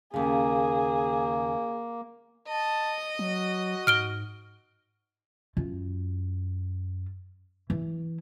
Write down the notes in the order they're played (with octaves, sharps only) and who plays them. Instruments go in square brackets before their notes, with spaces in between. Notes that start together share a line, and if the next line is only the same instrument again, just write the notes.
[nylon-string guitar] D#2 C#3 [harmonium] A#3 [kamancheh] G#4
[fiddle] D#5 [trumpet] A5
[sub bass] F#3 [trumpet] F#4
[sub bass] G#2 [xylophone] F6 D7 G7
[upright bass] F#2 F4
E3